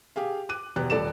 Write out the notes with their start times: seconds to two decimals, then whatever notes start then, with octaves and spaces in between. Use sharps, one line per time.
0.16 G4 G#4 F5
0.49 D6 F#6 D#7
0.76 E2 B2 G4 F#6
0.90 D#1 A4 D5 E7